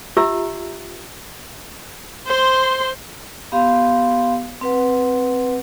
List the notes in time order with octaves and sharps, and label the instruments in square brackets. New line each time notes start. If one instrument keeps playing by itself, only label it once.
[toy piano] F4 G4 E5 A#5 E6
[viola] C5 C6
[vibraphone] B3 G4 F5 C6
C4 B4 F#5